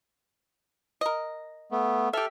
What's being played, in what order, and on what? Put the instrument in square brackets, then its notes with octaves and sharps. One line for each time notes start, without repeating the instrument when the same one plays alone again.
[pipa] A#4 D#5
[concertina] A3 B3
[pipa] G4 E5 [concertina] A4 F6